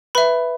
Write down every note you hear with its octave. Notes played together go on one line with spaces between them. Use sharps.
B4 E5 B5